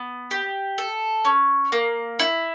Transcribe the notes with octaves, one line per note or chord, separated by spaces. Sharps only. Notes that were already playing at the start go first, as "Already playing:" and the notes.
Already playing: B3
G4
A4
C#4
A#3
E4